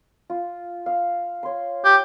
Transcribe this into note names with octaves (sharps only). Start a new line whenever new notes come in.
F4
F5
C#5 C6
G4